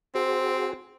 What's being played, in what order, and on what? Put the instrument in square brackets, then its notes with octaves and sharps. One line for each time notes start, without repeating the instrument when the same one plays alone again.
[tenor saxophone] C4 [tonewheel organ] F#4 G#4 C5